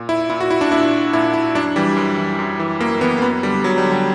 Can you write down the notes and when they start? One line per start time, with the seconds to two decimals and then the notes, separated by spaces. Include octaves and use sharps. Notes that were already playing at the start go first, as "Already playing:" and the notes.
Already playing: A#2
0.09 E4
0.30 A#2 E4
0.41 F#4
0.51 E4
0.61 D4
0.72 A#2 E4
1.13 A#2 E4
1.34 E4
1.55 F#2 D4
1.76 E3 G3
1.97 F#2
2.17 E3
2.39 F#2
2.59 E3
2.80 F#2 A#3
3.01 E3 B3
3.18 A#3
3.22 F#2 B3
3.43 D3 G3
3.63 F#2 F#3
3.78 G3
3.84 D3
3.91 G3